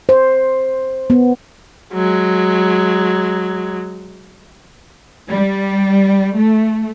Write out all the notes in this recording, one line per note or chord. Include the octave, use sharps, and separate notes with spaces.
C5
B3
F#3 G#3
G3
A3